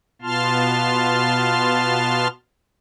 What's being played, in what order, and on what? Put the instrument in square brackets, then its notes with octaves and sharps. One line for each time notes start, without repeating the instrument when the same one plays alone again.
[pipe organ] B2 B3 F4 A5 C6 F6